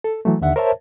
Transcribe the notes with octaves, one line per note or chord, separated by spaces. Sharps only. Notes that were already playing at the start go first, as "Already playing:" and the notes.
A4
E3 F#3 A3
D#2 D3 E5 F#5
A#4 C5 C#5 E5 A5